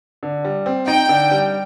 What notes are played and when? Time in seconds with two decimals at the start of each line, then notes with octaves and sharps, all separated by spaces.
0.23 D3
0.45 G3
0.66 C4
0.88 D#4 G5
1.09 D3
1.31 G3